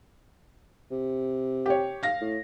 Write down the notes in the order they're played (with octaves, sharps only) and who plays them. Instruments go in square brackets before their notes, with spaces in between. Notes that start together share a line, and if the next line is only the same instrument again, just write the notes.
[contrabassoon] C3
[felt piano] G4 C#5
F5 A#6
[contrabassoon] A2